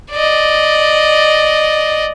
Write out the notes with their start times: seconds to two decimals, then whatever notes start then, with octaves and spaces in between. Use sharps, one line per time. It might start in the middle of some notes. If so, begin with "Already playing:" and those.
0.12 D5 D#5